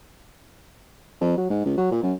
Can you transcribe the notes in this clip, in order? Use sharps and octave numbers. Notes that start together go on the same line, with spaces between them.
F2
F#3
G#2
C#2
F#3
A#2
F#2